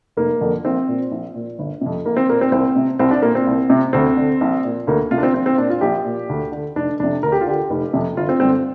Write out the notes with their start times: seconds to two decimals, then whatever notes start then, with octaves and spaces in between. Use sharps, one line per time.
0.17 F1 A#3
0.41 F2 D3
0.65 A#1 C4
0.88 A#2
1.12 A#1
1.35 A#2
1.59 G1
1.81 F2 C3
2.05 A#1 A#3
2.17 C4
2.29 A#2 A#3
2.41 C4
2.52 C2 C4
2.76 C3
2.99 C2 C4
3.11 D4
3.22 A#2 A#3
3.35 C4
3.47 C2
3.70 C3
3.93 D2 C4
4.16 D3
4.41 A#1
4.64 A#2
4.87 D2 A#3
5.11 C3 F4
5.18 D4
5.23 C4
5.34 A#1 C4
5.46 C4
5.58 A#2 D4
5.70 F4
5.81 A#1 G4
6.05 A#2
6.29 D2
6.52 D3
6.75 F1 D4
7.00 F2 C3 D4
7.23 D2 A#4
7.32 G4
7.41 F4
7.47 D3 G4
7.70 F1
7.93 F2 C3
8.17 G1 F4
8.29 C4
8.40 G2 D3 C4